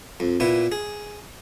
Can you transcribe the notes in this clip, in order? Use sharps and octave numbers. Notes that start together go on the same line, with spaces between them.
F2
A#2 B3 E4
G#4